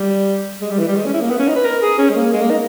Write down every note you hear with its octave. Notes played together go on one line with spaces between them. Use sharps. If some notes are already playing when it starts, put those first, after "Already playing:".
Already playing: G3
G#3
G3
E3
G3
G#3
C#4
E4
A#3
B3
C#4
D#4
B4
A#4
G#4
C#4
G#3
A#3
G#3
A#3
D#4